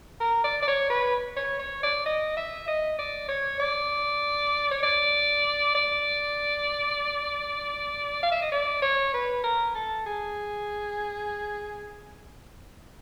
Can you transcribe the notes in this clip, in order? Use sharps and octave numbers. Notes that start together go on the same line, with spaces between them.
A#4
D5
D5
C#5
B4
C#5
C#5
D5
D#5
E5
D#5
D5
C#5
D5
C#5
D5
D5
F5
E5
D#5
D5
C#5
B4
A#4
A4
G#4